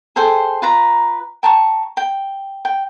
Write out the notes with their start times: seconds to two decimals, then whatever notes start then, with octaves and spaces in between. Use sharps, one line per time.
0.16 G#4 A4 C5 G5
0.62 F4 B4 A#5
1.43 G5 A5 A#5 C#6
1.97 G5
2.65 G5